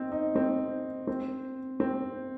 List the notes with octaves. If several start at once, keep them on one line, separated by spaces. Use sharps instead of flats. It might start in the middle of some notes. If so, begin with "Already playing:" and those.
Already playing: C4 D#4
D#4
C4
C4
C4